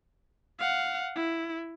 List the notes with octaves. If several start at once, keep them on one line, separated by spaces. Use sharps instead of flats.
F5 F#5
E4